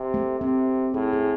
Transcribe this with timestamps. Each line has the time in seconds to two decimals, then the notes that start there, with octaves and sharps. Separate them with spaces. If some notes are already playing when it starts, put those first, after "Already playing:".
Already playing: C3
0.14 A3
0.40 C3 C4
0.94 A2 G#4
1.13 G#4